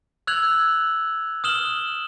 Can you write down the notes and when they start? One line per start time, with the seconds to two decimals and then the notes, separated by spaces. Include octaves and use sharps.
0.27 E6 F#6 G#6 F7 F#7
1.44 D#6 F6 E7 F#7 G7